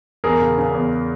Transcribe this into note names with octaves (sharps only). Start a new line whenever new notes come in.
E2 G#4 A#4
C#3
C#3
E2